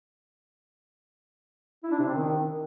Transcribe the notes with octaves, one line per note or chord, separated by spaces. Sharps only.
E4
D4
C3
C4
D#3